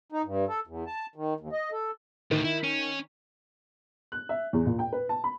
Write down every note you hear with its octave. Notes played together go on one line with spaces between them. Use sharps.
D#4
G2
A4
E2
A5
D#3
D#2
D#5
A4
D2 A2 D#3
E4
C#4
F#6
E5
E2
A#2
G5
B4
A5
B5